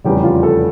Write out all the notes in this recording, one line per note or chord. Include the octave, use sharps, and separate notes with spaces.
F1 E2 C#3 G3 G4
F4
A4